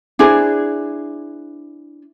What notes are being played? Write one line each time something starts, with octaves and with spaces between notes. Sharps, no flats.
D4 E4 G#4 C5